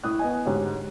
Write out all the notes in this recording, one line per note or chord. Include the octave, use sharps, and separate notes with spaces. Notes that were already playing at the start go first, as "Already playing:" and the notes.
A2 E4 D#6 F#6
B3 D#5 G#5
D2 G#2 G4 C#5